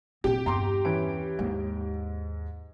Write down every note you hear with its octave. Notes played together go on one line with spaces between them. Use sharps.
A#2 C4 G4
E2 G2 A#5 C6 D6
E3 C#4 D7
D#2 G#2